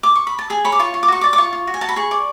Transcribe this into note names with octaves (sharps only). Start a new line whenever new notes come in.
D6
C#6
B5
A5
G#4 G#5
C#5 B5
D6
F4 C#6
F4
D6
F#4 C#6
D5 D6
D6
F4 C#6
F4
F#4
G#5
F#4 A5
B5
G#4 C#6
D5